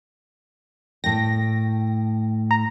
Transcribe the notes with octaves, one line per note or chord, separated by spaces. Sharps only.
A2 G5 A#6
A#5